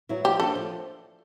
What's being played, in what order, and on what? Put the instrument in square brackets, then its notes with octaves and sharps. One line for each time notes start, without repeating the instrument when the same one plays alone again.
[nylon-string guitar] F#3 B3 E4
[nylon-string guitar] F3 [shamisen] G4
[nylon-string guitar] A#3 D4 F4 [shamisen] A4
[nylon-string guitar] F3